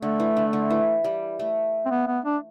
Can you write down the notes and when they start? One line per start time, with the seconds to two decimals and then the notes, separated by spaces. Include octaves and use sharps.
0.02 D3 A3
0.20 E3
0.37 D3
0.53 D3
0.70 E3
1.04 G3
1.39 A3
1.86 C4
1.91 B3
2.07 B3
2.25 D4